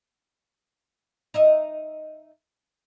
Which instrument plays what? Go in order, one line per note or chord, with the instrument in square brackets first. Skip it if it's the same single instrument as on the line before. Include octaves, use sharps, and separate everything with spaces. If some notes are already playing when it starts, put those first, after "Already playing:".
[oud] D#4 D#5 E5